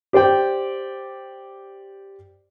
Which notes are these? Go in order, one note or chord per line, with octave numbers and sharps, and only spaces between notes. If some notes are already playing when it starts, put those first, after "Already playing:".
G4 C5 D5 G5